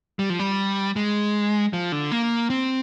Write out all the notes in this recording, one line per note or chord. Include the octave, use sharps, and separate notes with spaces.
G3
F3
G3
G#3
F3
D3
A#3
C4